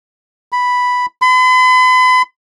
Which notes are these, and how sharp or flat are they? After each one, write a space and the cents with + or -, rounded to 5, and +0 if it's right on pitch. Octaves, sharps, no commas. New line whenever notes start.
B5 +0
B5 +45